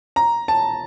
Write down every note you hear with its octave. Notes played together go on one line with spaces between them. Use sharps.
A#5
A5